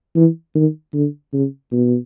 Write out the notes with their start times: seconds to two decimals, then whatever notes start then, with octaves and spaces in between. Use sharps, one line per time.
0.16 E3
0.55 D#3
0.94 D3
1.33 C#3
1.72 B2